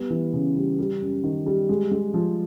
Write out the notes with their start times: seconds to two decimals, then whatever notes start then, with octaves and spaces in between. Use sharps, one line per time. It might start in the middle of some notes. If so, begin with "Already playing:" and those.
Already playing: G3 B3
0.10 E3
0.33 C#3
0.56 G3
0.79 G3
1.01 F#2
1.24 D#3
1.46 G3
1.69 G#3
1.91 G#3
2.14 F3